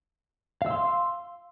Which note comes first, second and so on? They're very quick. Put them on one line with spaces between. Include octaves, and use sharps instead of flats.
F5 E6 C6